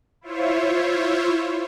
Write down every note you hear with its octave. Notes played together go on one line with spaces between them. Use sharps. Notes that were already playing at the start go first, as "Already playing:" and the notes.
E4 F4 C5 C#5 E5